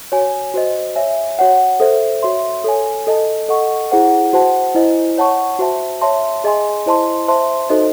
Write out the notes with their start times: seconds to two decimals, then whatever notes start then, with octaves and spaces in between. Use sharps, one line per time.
0.12 F#4 C#5 G#5
0.54 F#4 C5 D#5
0.96 C#5 E5 G#5
1.39 F#4 C#5 F#5
1.80 A4 C5 E5
2.23 F#4 C#5 E5 C6
2.64 A4 C#5 G#5
3.07 A4 D#5 A5
3.49 A4 D#5 F#5 C#6
3.91 E4 G#4 C5 F#5
4.33 F#4 C5 F#5 A5
4.75 E4 C5 D#5 G#5
5.18 C#5 F#5 A5 C#6
5.59 F#4 C5 E5 A5
6.01 C#5 E5 A5 C6
6.44 G#4 D#5 G#5 C6
6.86 E4 C5 D#5 A5 C6
7.28 C5 E5 A5 C6
7.70 D#4 F#4 A4 C5 D#5